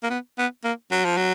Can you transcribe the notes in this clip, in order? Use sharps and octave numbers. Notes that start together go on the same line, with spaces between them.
A#3
B3
B3
A#3
F#3
F3
F#3